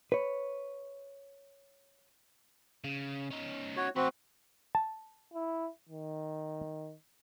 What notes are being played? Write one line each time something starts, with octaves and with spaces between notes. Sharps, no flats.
B4 C#5
C#3
C#4 D#4
F#4 C#5
A3 C4 F#4 B4
A5
E4
D#3